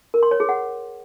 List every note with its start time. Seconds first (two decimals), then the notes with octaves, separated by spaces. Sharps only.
0.14 A#4
0.23 C6
0.31 C#5
0.40 G#4
0.49 F#5